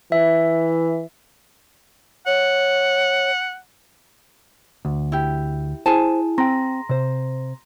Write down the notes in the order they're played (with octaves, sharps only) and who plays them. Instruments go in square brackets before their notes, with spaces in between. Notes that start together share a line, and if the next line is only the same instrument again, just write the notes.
[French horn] E3 [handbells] E5
[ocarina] C#5 [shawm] F#5
[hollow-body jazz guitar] D2
[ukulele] E4 G4
[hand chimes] E4 [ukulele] G#4 G#5 A5 [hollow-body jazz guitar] C5
[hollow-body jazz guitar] C4 G5 [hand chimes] A#5 C6 A#6
[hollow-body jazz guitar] C3 C5